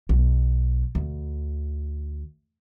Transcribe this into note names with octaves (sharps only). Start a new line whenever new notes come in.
B1
D2